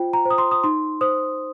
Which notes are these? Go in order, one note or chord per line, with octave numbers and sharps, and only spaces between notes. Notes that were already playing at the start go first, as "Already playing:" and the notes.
Already playing: F4 C5 G5
A#5
C5
D#6
C6
D#6
D#4 C6
C5 D#6